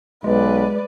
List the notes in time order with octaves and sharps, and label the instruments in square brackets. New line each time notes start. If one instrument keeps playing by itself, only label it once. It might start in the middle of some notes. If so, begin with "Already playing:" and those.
[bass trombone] B1 [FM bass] G#3 [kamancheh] B4 D5